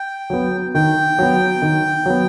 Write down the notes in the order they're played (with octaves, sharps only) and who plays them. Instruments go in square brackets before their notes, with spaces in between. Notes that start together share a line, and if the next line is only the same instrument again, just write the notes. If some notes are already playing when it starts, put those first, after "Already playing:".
Already playing: [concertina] G5
[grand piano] F#3 B3
[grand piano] D#3 [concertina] G5
[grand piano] F#3 B3
D#3
F#3 B3